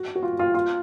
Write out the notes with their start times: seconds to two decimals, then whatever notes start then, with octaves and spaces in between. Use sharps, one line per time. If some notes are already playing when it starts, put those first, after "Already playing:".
Already playing: F#4
0.15 F#4
0.23 F4
0.39 F4
0.54 F4